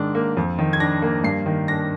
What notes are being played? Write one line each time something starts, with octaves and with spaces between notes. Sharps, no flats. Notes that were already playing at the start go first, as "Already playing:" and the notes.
Already playing: G#2 D#3 D4
A#3
F2
D#3
G#6
D4 A#6
A#3
G2 C7
D#3
D4 A#6